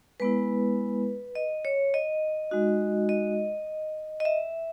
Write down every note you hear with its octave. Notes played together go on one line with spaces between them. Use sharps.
G#3 B3 E4 B4
D#5
C#5
D#5
G#3 D#4 F#4
D#5
D#5
E5